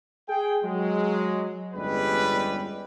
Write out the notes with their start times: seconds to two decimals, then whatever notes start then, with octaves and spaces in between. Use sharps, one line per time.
0.29 G#4 G5
0.63 F#3 G#3
1.74 G1 E2 G3 G#3 C#4 B4